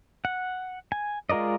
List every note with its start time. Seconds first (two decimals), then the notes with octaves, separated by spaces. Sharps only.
0.25 F#5
0.92 G#5
1.29 G#3 F4 A#4 D5 D#5